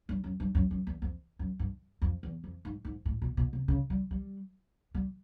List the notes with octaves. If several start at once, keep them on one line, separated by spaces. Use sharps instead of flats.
G2
F#2
G2
F#2
F#2
E2
F2
F#2
G2
F2
E2
F2
G#2
G#2
A2
B2
B2
C3
C#3
G3
G3
G3